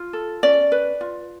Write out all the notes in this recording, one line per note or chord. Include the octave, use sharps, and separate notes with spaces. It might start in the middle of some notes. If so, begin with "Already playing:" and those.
Already playing: F4
A4
C#4 D5
B4
F4